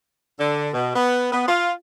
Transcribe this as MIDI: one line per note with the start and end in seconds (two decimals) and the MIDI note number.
0.39 0.70 50
0.74 0.94 47
0.96 1.29 59
1.33 1.45 59
1.48 1.71 65